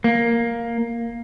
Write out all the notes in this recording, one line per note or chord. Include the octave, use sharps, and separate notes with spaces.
A#3